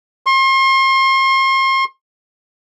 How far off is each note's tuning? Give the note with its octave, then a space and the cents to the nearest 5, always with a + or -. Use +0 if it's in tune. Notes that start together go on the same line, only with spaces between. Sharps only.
C6 +40